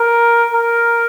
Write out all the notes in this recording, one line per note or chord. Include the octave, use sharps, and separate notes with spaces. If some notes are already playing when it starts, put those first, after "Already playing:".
Already playing: A#4
A#4